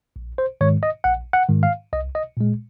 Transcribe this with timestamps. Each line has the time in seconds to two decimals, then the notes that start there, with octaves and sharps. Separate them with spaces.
0.16 A#1
0.38 C5
0.61 G#2 D#3 G#3 C#5
0.83 D#5
1.04 A#1 F#5
1.33 F#5
1.49 G#2 D#3 G#3
1.63 F5
1.93 C2 D#5
2.15 D#5
2.37 A#2 G#3